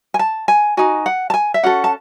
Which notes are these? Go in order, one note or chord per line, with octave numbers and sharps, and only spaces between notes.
G#5
A5
G#5
D#4 F#4 G#5
F#5
A5
G#5
E5
C#4 F#4 A4 F#5
A5